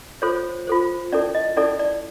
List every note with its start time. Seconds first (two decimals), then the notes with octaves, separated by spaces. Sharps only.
0.22 F4 A4 C5 C#5
0.67 F4 A4 C5
1.12 C#4 E4 A4 D5
1.35 D#5
1.57 C#4 E4 A4 D5
1.79 D5